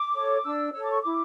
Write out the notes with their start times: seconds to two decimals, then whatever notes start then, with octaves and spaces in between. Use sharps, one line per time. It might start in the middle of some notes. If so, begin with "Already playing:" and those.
Already playing: D6
0.13 A4 C#5
0.44 D4 E6
0.73 A4 C#5 E6
0.83 D6
0.91 C#6
1.01 E4 D6